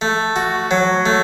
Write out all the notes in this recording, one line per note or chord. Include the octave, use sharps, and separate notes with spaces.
A3
F#4
F#3
A3